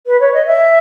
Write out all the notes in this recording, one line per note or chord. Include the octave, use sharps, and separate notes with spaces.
B4
C#5
D#5
E5